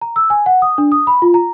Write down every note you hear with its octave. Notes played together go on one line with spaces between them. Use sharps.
A#5
E6
G#5
F#5
D#6
D4
D#6
B5
F4
A#5